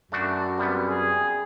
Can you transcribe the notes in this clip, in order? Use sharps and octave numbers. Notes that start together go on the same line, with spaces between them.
F#2 A3 D4 F#4
C3 G3 B3
G#4